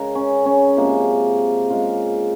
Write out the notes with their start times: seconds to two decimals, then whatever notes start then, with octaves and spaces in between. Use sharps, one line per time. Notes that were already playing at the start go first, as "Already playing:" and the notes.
Already playing: C#3 G#3 A#4
0.15 C#4
0.46 C#4
0.77 C3 F3 G#3 A#3
1.70 C#3 G#3 F4